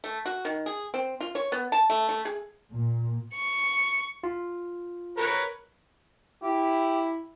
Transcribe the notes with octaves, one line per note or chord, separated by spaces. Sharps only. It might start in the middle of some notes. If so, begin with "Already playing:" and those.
A3
F#4
D#3
G#4
C4
F4
C#5
B3
A5
A3
A3
G#4
A#2
C#6
F4
A#4 B4 C#5
E4 G4